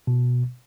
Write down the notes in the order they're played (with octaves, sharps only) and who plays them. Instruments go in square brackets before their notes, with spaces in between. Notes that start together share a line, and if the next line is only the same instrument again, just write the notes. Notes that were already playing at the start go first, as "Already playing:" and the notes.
[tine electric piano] B2